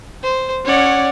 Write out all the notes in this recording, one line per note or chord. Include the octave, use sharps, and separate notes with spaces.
C5
C#4 C#5 D5 F#5